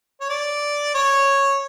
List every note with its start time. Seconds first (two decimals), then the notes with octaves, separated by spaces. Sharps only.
0.21 C#5
0.30 D5
0.95 C#5